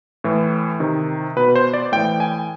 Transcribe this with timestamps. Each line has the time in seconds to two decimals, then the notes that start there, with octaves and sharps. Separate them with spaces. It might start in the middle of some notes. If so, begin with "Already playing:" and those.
0.24 A2 E3
0.80 C3 D#3
1.36 B2 B4
1.55 C5
1.73 D5
1.92 A2 E3 G5
2.20 G#5